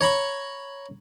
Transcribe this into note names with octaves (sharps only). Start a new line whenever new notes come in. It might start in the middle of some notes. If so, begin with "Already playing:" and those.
C#5 A#5 B5 C#6